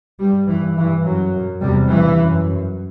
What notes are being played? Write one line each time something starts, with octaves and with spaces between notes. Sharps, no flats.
G2 G3
G2 E3
G2 E3
F#2 F#3
F#2
E2 C3 G3
G2 E3
F#2
F#2